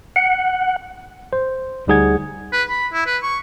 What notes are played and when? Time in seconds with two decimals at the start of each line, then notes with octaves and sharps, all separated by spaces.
0.16 F#5
1.33 C5
1.87 D2 G3 D#4 G#4 F#5 G#6
2.52 B4
2.70 B5
2.93 E4
3.06 B4
3.23 C#6